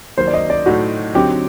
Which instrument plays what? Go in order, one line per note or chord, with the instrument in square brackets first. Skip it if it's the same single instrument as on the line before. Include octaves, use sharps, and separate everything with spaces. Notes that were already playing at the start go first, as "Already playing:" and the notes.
[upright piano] D#3 F#3 A#3 [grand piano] C5
[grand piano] D5
D#5
D5
[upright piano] A2 F#3 A3 D#4 [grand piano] F#4
[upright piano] D3 F#3 C4 D#4 [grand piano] G4